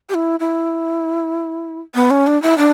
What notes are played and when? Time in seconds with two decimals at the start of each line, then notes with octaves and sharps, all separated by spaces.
0.09 G4
0.14 E4
0.40 E4
1.95 B3
2.11 C#4
2.27 D4
2.42 E4
2.58 D4